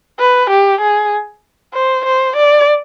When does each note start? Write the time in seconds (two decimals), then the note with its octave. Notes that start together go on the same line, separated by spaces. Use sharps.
0.20 B4
0.50 G4
0.81 G#4
1.74 C5
2.05 C5
2.37 D5